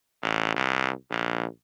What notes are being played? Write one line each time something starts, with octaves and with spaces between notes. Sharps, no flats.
A1
C2
A#1